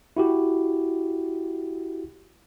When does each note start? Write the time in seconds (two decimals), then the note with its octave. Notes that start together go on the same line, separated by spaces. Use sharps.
0.17 E4 F#4 G4